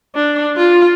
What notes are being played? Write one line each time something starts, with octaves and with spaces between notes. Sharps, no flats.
D4
F4